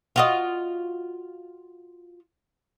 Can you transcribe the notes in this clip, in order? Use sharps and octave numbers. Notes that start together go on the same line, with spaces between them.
F4 F#4 D#5